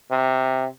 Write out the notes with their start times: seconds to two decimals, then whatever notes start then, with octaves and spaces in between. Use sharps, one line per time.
0.11 C3